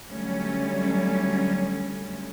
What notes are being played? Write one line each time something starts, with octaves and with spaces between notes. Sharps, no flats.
D3 F#3 G3 A3 C#4